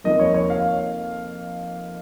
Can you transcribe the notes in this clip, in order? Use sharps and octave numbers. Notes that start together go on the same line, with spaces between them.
F2 D#3 A#3 D#5
C#5
C#5
F5